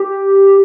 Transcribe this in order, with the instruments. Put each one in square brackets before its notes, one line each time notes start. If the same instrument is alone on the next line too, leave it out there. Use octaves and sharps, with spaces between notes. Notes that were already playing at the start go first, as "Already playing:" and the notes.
Already playing: [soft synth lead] G4